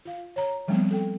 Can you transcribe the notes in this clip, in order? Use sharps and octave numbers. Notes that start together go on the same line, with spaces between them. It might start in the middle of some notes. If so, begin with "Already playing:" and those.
F4 F5
C#5 A#5
F3 G3 A3 B3 C4
A4 G5